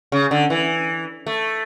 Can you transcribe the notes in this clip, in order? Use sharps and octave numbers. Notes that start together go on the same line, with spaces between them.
C#3
D3
E3
A3